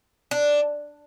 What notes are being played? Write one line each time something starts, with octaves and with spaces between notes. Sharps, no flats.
D4